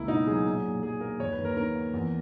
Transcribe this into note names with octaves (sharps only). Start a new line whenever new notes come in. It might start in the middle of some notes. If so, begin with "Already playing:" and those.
Already playing: C#2 A#3 E4
B2 D#4
F#3 G#4
A#2
A#2
F#3 G#4
A#3 A#4
D#2 C#5
B4
D#2
A#4
D#3 A#4
A#3
E2